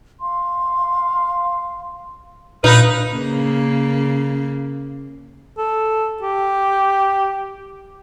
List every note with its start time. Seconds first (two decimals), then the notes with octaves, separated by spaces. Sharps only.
0.20 F5 C6
2.64 A#2 D#4 B4 F5 D#6 F6
3.13 C#3 A#3
5.58 A4
6.23 G4